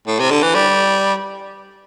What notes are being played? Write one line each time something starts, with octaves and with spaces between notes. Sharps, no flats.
A2
C3
D3
E3
G3